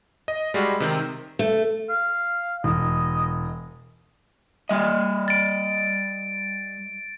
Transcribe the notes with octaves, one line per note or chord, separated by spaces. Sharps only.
D#5
G3 G#3 F#4
C3 D#3 C4
A3
F5
E1 D#5
G3 D#5
A6 D7